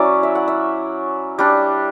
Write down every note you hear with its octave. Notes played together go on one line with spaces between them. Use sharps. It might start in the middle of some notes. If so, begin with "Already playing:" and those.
Already playing: F#3 C#4 E4 D5
E5
F#5
E5
G3 D4